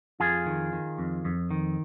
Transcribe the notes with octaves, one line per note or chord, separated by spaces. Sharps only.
F2 F4 G#4
D#3
D#3
F2
F2
D#3